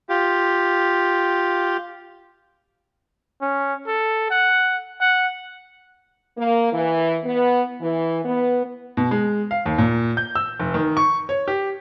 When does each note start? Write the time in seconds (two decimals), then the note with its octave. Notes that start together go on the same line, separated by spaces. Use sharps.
0.09 F4 G4
3.42 C#4
3.87 A4
4.31 F#5
5.01 F#5
6.37 A#3
6.72 E3
7.24 B3
7.81 E3
8.24 B3
8.97 B2
9.11 G#3
9.51 F5
9.66 D#2
9.78 A#2
10.17 G6
10.35 E6
10.60 F1
10.74 D#3
10.97 C#6
11.29 C#5
11.48 G4